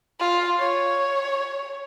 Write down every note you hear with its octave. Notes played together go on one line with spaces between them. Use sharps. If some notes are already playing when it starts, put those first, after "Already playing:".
F4
C#5